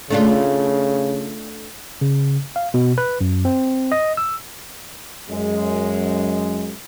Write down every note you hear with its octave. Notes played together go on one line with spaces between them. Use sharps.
C#3 A3 D4 F4
C#3
F5
B2
B4
F#2
C4
D#5
E6
F#2 G#3